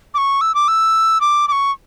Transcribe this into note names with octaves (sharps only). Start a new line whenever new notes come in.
D6
C#6
E6
D6
E6
D6
D6
C#6